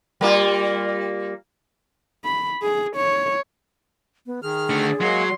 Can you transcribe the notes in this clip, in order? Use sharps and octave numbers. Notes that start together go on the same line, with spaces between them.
G3 A#3 F4
B5
G#4
C#5
B3
D#3 G#4 F6
D3 A3
F#3 G#3 A#3 C6